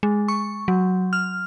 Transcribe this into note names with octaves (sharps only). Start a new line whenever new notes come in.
G#3
C#6
F#3
F6